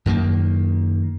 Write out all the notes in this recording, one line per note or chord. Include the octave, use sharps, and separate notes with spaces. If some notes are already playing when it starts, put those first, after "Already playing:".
F#2 D#3 A#3